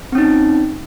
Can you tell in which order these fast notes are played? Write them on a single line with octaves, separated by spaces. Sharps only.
C4 C#4 D#4